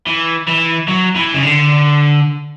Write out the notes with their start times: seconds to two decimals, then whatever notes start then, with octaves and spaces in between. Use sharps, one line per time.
0.07 E3
0.48 E3
0.88 F#3
1.16 E3
1.34 C#3
1.43 D3